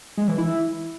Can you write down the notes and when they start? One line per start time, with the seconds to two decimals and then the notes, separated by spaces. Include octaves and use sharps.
0.17 G#3
0.28 E3
0.38 E4